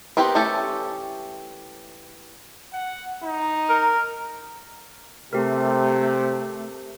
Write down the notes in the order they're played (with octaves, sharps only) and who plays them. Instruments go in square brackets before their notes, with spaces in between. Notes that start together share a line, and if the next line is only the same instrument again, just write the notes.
[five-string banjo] B3 C4 G4 A#4 B4
E3 A3 C#4 G4 A4
[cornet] F#5
D#4
[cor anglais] A#4
[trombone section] C3 [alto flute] A3 [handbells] G4 A#4